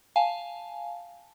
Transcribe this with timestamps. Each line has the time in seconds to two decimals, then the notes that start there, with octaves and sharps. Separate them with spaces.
0.16 F5 G#5 A5